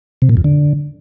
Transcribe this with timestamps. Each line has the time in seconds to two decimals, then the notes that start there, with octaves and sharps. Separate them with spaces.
0.22 C3
0.29 A#2
0.37 F2
0.44 D3